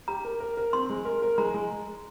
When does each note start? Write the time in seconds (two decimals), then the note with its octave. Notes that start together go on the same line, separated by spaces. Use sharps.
0.08 G4 A#5
0.25 A#4
0.40 A#4
0.57 A#4
0.73 C4 C6
0.90 G#3
1.05 A#4
1.22 A#4
1.38 G#3 A#5
1.54 G#3